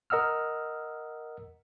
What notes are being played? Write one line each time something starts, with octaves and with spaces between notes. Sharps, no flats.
A#4 D#5 F#5 E6 F6